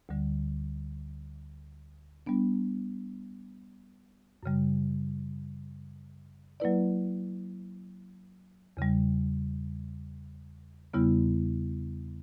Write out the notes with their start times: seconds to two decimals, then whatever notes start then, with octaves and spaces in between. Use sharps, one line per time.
0.09 D2 D3 G3
2.26 G3 B3 D4
4.43 F#2 C#3 G3
6.60 F#3 A#3 E4 B4 D5
8.77 E2 C#3 G3
10.94 E2 C#3 G3 B3 E4